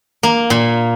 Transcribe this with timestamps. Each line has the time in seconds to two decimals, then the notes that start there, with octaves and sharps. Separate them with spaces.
0.23 A#3
0.50 A#2